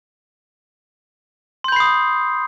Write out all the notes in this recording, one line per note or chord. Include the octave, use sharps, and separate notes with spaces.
B5 C6 D#6 G6 C7